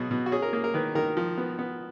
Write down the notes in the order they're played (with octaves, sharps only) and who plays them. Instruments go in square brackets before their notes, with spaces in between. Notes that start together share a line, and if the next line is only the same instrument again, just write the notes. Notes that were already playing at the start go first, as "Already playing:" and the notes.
Already playing: [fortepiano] B2 F#3 F#4 G#4
B2
F#4
C#4 G#4
A#4
A#3 G#4
A#4
D#3 B4
D#3 A#4
F3
B3
B3